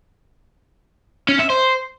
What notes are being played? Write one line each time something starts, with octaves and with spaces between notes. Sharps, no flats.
C#4
E5
C5